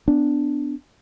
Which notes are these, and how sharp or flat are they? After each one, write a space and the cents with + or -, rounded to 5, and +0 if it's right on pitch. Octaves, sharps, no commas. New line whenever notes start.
B3 +25 D4 +0